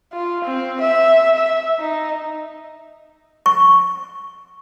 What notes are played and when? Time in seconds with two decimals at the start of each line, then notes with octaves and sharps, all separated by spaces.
0.13 F4
0.44 C4
0.81 E5
1.36 E5
1.79 D#4
3.46 C#6